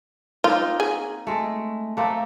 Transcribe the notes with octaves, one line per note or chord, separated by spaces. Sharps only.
A#3 C4 D#4 F4
G#4
G#3 A3
A3 A#3 C4